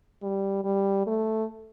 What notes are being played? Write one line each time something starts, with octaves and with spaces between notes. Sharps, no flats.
G3
G3
A3